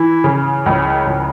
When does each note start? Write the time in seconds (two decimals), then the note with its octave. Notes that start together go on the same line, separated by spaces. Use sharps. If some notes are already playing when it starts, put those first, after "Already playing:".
Already playing: E3 E4
0.24 C#3
0.66 C#2
1.07 C#2